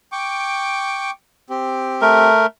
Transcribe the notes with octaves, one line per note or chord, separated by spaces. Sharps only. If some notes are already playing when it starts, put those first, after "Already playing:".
G5 C#6 D6
C4 G4
A3 A#4